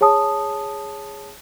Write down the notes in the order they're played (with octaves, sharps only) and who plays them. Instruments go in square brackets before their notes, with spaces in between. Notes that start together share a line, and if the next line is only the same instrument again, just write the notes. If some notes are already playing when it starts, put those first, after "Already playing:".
[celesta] G#4 C#5 G#5 A5 D#6